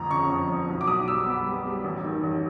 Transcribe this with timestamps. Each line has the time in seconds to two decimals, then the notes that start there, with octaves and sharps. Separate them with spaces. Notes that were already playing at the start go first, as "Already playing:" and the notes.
Already playing: G1 F2 F3 A#5
0.11 C#3 C#6
0.31 F2
0.50 F3
0.69 B1
0.81 D6
0.87 B1 D#6
1.07 G3 E6
1.26 B3
1.46 G3
1.66 G3
1.84 A1
2.04 D#3
2.23 A1